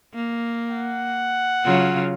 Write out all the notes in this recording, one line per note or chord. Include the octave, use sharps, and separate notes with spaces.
A#3
F#5
C#3 F#3 F4